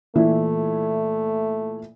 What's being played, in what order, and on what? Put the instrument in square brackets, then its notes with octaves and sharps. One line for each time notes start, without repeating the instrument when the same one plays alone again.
[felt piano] A#2 E3 E4 [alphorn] A3